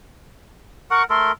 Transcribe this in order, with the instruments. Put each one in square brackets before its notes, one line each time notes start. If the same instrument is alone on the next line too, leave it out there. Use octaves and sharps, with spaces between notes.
[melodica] A#4 F#5 [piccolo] C#6
[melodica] A3 A4 A#4 [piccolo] C6